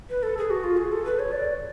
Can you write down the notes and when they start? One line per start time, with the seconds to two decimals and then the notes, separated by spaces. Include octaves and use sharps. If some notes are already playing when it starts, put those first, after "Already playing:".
0.10 B4
0.23 A4
0.38 G#4
0.50 F#4
0.64 F4
0.77 G#4
0.92 A4
1.05 B4
1.19 C#5
1.32 D5